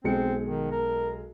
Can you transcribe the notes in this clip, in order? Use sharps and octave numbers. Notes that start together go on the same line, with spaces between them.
B1 G#3 C4 C#7
D#3
A#4